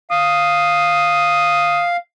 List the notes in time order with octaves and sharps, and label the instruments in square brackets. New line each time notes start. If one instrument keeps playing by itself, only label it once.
[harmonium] F5 [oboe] D#6